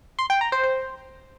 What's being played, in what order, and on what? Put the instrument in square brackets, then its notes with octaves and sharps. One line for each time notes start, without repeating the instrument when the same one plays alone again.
[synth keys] C6
G5
A#5
C5
C5